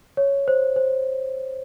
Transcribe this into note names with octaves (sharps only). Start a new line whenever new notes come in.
C#5
C5
C5